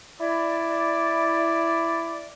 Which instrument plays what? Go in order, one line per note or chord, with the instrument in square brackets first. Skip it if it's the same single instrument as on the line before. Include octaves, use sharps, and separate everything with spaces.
[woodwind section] E4 D5